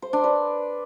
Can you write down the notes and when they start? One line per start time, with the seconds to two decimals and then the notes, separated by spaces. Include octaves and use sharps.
0.02 C5
0.13 D4
0.24 B4